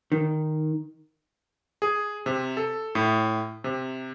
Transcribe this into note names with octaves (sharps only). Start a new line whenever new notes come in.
D#3
G#4
C3
A4
A2
C3